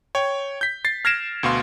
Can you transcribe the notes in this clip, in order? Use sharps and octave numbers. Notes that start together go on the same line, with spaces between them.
C#5 G5
G6 B6
A6 C7
F6 G#6 A#6 C7 D7 E7
D2 B2 F5 C6